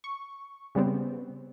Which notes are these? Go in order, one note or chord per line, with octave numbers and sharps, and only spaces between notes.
C#6
C#3 G3 B3 C4